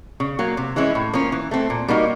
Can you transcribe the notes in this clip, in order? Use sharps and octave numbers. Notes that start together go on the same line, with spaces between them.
C#3
F#3 A#3
C3
E3 G#3 C#4 E4
A2
F3 A#3 C#4
E3
A3 C4
A#2
G3 A#3 D#4 F#4